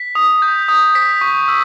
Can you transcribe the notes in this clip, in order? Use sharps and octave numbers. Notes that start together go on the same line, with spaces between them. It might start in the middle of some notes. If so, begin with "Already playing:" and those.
Already playing: B6
D#6
G6
D#6
B6
C#6
E6